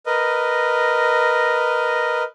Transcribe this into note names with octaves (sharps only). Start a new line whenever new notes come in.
A#4 B4 D#5